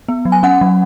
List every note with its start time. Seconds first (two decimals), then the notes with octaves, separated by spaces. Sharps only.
0.09 B3
0.25 F#3
0.32 G#5
0.43 C#4 F#5
0.61 F#3